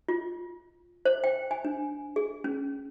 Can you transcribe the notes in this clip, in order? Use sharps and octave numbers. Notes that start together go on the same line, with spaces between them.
F4
C5
G5
G#5
D4
G#4
C#4